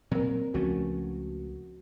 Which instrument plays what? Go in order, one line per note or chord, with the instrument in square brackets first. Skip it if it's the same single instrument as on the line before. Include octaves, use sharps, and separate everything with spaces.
[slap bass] A#2 F#3 [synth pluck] C4 A#4
[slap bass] C#2 A3 C#4 [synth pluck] F3 F#4